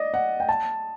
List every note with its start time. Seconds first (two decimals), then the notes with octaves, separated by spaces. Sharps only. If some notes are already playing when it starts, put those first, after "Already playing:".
Already playing: D5 D#5
0.14 F#5
0.40 G5
0.49 A5